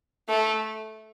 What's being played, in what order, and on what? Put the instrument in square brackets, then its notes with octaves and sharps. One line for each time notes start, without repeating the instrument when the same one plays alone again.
[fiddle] A3